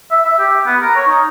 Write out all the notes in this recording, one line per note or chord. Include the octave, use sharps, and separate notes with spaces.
E5
E5
G4
B3
A#4
C#5
D#4